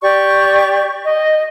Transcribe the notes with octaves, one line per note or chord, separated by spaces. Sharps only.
G4 D5 C#6
D#5